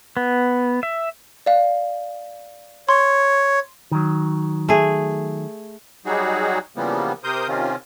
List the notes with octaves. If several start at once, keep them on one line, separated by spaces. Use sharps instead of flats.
B3
E5
D5 F5
C#5 C6
D#3 F#3
A3 G#4
F#3 G3 D#4 F#4 G#4
C#3 E3 F3 G3 A#3 B3
C3 A#4 C5 D#6 G6
C3 D#3 C4 C#4 F4